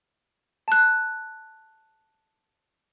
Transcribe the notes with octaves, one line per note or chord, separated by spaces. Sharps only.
A5 F#6